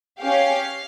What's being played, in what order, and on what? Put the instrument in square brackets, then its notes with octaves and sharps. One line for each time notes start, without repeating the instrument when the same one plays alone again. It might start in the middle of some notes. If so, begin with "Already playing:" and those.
[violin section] C#4 G4 F5